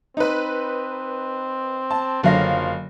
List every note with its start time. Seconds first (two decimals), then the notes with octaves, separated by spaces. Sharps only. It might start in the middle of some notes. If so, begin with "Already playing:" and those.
0.17 C4 D#4 B4
1.91 A5
2.23 F#1 D3 F3 F#3 F5 A#6